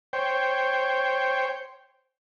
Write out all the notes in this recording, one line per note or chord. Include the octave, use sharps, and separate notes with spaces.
C5 C#5 G5